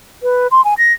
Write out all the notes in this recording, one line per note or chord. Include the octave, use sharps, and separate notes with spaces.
B4
C6
G#5
A#6